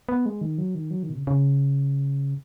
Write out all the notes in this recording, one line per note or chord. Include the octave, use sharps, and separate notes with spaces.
B3
G#3
D#3
F#3
D#3
F#3
D#3
B2
C#3
C#3